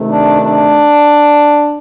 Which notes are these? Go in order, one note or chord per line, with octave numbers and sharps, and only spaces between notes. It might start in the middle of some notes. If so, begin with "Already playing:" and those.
Already playing: C3 D#3 A3
D4
D4